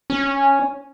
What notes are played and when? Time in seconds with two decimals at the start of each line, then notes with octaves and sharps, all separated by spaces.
0.10 C#4